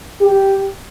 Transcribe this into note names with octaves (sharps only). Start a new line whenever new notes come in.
G4